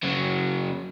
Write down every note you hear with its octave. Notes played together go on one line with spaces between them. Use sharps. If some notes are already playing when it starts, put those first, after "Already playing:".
C#3 F#3